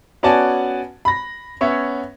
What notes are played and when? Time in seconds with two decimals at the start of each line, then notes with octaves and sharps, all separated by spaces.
0.23 B3 C#4 F#4 D5 G#5 A5
1.05 B5 A#6
1.61 B3 C#4 C#5 E5